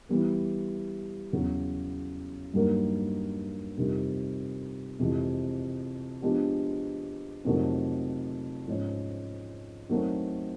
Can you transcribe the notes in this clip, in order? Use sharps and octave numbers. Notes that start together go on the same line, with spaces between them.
E3 G3 B3
E2 C#3 F#3
G2 D#3 F#3 A#3
F2 C3 D#3 G3
F2 C3 E3 G#3
F3 G#3 B3 D4 G4
F2 C3 D#3 F#3 A3
G#2 F3 G#3 C#4
D#3 F#3 A3 C4